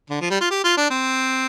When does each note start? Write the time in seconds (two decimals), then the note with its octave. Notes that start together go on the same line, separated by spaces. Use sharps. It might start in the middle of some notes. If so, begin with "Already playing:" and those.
0.10 D3
0.21 F3
0.30 G3
0.40 F4
0.50 G4
0.64 F4
0.77 D4
0.90 C4